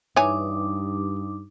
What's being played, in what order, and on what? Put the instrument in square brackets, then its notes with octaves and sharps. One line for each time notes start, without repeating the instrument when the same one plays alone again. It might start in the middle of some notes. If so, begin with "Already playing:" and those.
[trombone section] G2 [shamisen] E3 C#5 G#5 [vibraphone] D#4 D6